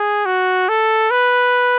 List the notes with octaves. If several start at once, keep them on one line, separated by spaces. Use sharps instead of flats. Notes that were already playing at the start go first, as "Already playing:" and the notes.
Already playing: G#4
F#4
A4
B4